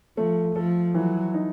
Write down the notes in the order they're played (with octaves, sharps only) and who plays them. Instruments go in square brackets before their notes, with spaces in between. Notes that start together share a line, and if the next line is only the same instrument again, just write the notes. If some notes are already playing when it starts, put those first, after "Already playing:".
[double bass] F3 [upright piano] A3
[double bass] F3 [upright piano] A4
[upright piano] E3 [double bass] F#3
[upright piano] D#4